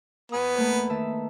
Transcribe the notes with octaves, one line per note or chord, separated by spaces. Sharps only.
E2 B3 G#5 D#6
A3 A#3 B4
D#3 E5 A5